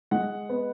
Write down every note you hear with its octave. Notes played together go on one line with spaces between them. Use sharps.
G#3 F#5
B3